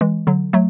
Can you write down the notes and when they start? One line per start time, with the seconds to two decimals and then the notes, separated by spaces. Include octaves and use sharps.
0.01 E3 G#3
0.27 D3 F#3
0.53 F#3 A3